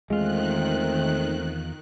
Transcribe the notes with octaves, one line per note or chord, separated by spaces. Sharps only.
E2 D#3 G#3 A3 C4 F4 F#6